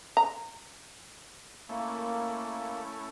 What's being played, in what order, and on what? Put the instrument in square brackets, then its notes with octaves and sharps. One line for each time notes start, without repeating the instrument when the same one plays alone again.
[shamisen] A#5
[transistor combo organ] A3 C#4 E4 [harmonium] A#3